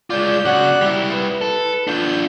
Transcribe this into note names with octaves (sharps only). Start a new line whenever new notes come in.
G#3 F4 D5 G6
C#3 F#4 D5 F#5 F#6
G3 E4
B4
A4
D4 F4 G6